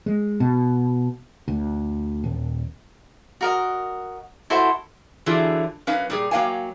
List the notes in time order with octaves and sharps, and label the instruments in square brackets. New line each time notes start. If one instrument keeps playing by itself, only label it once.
[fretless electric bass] G#3
B2
D2
D#1
[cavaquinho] F#4 A#4 D#5
E4 F#4 A4 C5
[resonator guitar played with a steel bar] D3 E3 F#3 F4 G#4
F#2 C#4 D#4 B4 F5
A#2 G3 G#4
F#3 A#3 B3 F5 G5 G#5